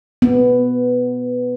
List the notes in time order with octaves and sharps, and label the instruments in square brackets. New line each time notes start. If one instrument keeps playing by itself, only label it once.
[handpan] B3